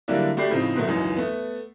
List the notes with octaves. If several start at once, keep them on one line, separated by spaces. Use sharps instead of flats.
D3 F#3 G3 A#3 D4 E4
A3 F#4 G4 D5 B5 C7
A2 C#3 F3 C4 D#4
G#2 B2 D#3 F#3 A3
C#2 F#2 E3 D#4
A3 B3